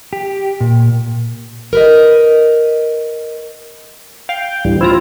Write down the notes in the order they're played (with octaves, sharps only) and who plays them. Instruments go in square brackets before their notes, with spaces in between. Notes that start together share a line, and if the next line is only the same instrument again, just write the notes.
[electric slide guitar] G4
A#2
[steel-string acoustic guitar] A#4 B4 D#5
[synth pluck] F5 [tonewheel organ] G5
[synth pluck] D2 [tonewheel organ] A2 E3 G3
[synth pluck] E4 F4 A#5 [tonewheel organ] C5